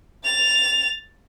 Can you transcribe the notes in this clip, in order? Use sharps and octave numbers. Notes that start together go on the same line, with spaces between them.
A6 F7